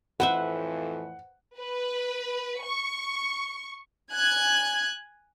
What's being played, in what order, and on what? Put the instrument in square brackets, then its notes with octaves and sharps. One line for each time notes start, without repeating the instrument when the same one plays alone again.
[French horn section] F2 A2 E3 [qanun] B4 C5 E5 [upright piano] F#5
[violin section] B4
C#6
G#5 F#6 G#6